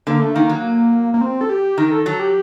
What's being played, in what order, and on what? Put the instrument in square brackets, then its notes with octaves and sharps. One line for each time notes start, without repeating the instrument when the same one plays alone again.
[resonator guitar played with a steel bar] D3 [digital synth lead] A#3
[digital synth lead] A3
[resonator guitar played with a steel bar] D#3 [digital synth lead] A#3
[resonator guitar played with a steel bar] F#3
[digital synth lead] A#3
C4
A4
G4
[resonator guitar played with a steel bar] D#3 [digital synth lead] A#4
[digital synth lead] A4
[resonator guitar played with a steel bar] F#3 [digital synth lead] A4
[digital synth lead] G4